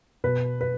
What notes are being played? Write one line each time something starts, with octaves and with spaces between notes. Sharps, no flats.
B2 B4
B4